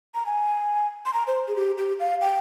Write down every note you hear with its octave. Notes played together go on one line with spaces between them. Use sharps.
A#5
G#5
C6
A#5
C5
G#4
G4
G4
F5
G5